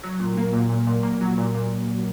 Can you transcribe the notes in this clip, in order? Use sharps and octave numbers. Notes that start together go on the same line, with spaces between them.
F#3
A#2
A#3
A#2
A#2
A#2
A#3
F#3
A#2
A#2